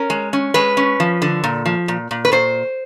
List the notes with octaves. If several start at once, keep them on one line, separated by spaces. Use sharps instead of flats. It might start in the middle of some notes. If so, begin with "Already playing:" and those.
Already playing: C#4 A#4
G#3
C#4
G#3 B4
C#4
F3
D3
A#2
F3
A#2
A#2
B4
A#2 C5